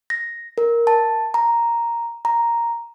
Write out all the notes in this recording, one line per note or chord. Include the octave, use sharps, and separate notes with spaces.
A#6
A#4
A5
A#5
A#5